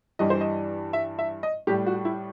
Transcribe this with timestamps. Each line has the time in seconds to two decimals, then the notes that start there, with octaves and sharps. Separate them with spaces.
0.19 G2 E3 G3 D#5
0.30 C5
0.41 D#5
0.93 E5
1.19 E5
1.43 D#5
1.67 A2 G3 G4
1.86 F#4
2.05 E4